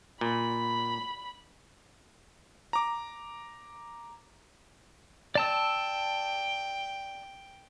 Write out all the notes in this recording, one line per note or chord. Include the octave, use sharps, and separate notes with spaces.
A#2 B5
A#5 D6
D5 G5 A5 E6